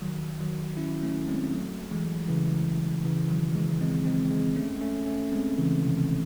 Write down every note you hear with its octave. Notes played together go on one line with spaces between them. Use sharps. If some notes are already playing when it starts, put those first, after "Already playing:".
D#3 F#3
D#3 F#3
C#4 E4
A3 C#4
G#3 C4
F#3 A3
E3 G#3
C#3 E3
C#3 E3
D#3 F#3
E3 G#3
G#3 C4
G#3 C4
G#3 C4
A3 C#4
A3 C#4
A3 C#4
G#3 C4
C#3 E3
C3 D#3